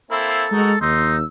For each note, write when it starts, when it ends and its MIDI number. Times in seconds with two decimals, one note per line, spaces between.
0.11 0.45 58
0.11 0.45 60
0.11 0.45 64
0.11 0.79 69
0.11 0.59 88
0.52 0.76 56
0.52 0.71 63
0.52 0.71 66
0.52 0.71 70
0.81 1.23 39
0.81 1.16 63
0.81 1.10 84
0.81 1.25 88